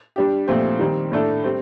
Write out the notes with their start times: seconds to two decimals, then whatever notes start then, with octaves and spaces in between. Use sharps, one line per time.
0.16 G3 D4 G4
0.47 A#2 F3 A3 C4 G4
0.79 D#3 G3 C4
1.12 A2 A3 D4 A4 D5
1.44 G3 C4